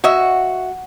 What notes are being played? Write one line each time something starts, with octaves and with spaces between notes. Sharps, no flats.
F#4 C#5 D#5 E5